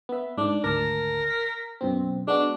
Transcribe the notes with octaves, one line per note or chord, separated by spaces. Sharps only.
B3 E5
G#2 D4
G#1 D2 A#4 A5
B6
F#2 B2 C4
G#3 B3 D4 F#4